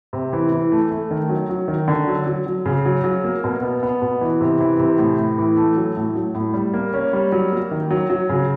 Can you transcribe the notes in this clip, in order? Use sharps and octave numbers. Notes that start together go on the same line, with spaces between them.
C3
E3
E3
A3
A3
D#3
F#3
F#3
D#3
D3
F#3
F#3
F#3
C#3
F#3
F#3
A#3
B2
B3
B3
B2
E3
C3
E3
C3
A2
A2
E3
A3
F#3
A2
F#3
A2
G3
A#3
C#4
G3
F#3
A#3
D#3
F#3
F#3
C#3